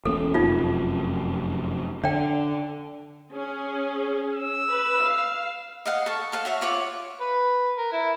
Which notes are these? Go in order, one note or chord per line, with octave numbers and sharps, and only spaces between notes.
E1 A#3 C#4 A4
F1 F#2 D#4 F4
D3 D5 G5
C#4 G#4
E6
B4
F5
D#5 F5 F#5
A4 C#6
A4 F5 F#5
F#4 C#5 E5
F4 C#5 F#5 D6
B4
A#4
E4